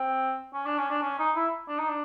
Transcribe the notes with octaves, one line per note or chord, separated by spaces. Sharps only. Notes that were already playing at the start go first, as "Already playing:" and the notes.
Already playing: C4
C#4
D4
C#4
D4
C#4
D#4
E4
D4
D#4
D4